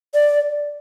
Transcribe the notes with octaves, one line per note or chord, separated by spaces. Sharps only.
D5